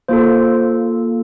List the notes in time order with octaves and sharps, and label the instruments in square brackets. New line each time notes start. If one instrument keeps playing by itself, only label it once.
[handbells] A#3 F4 A4 C5